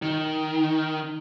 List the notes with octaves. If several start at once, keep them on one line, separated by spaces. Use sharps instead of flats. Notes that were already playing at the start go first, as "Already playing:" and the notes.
D#3